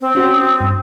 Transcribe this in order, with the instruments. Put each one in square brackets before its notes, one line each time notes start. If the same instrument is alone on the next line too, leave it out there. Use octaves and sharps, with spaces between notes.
[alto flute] C4
[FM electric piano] C#4 F#4
D#6
G2